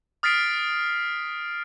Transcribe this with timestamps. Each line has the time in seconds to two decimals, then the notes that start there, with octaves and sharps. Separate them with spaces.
0.23 D#6 F6 A6 B6 C7 D7